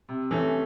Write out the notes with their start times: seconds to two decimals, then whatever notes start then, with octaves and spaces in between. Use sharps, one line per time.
0.09 C3
0.31 E3 A3 C#4